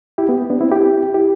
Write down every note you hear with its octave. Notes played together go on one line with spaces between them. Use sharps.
E4 G4
B3
B3 D4
C4 E4
E4 G4
E4 G4